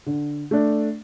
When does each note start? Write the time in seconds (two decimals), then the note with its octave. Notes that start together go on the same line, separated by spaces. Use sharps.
0.06 D3
0.51 A3 D4